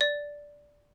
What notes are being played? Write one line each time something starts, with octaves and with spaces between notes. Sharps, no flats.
D5